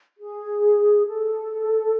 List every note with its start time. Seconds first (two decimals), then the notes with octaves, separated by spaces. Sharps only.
0.18 G#4
1.07 A4